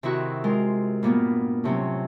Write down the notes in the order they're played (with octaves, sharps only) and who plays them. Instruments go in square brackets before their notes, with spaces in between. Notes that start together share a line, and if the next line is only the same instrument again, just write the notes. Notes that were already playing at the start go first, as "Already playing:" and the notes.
[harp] C3 D#3 E4 F#4 F#6
G#3 F4 A#4
G2 A#2 A#3 B3
A2 C3 F#3 C#4